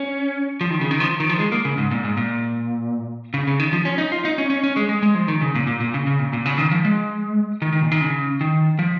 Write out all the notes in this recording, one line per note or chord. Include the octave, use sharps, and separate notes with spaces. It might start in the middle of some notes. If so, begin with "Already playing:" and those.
Already playing: C#4
F3
D#3
C#3
D#3
F3
D#3
F3
G#3
A#3
C#3
G#2
A#2
G#2
A#2
C#3
C#3
D#3
F3
C#4
D#4
F4
D#4
C#4
C#4
C#4
G#3
G#3
G#3
F3
D#3
C#3
A#2
A#2
A#2
C#3
C#3
A#2
A#2
C#3
D#3
F3
G#3
D#3
D#3
A#2
D#3
C#3
D#3
F3